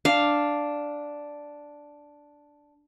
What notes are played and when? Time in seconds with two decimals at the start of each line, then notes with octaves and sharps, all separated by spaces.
0.05 D4 F5